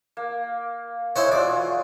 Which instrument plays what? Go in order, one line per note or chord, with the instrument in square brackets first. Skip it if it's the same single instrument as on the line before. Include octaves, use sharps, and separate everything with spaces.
[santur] A#3
[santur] G#3 [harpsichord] E4 C5 C#5
[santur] F#3 F4 G#4 [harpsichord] D5